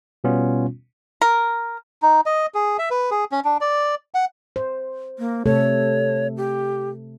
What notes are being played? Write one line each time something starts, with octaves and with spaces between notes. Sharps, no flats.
B2 G3 B3 C#4 F4
A#4
D#4
D#5
G#4
E5
B4
G#4
C#4
D4
D5
F#5
C5
A#3
C3 A3 A4 C#5
G4